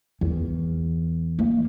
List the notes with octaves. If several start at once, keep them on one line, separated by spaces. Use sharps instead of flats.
E2
A#3